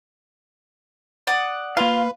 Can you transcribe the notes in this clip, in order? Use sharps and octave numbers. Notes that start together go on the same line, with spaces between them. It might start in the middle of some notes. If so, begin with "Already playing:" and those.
D5 F#5 D#6
A#3 F4 B4 F5